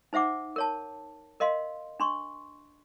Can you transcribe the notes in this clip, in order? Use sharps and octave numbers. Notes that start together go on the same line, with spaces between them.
D#4 C5 E5 F#5 D6
A#4 C#5 A5
A#4 D#5 F5 C6
D4 C6 C#6